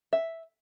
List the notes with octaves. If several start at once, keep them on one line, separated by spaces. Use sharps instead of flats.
E5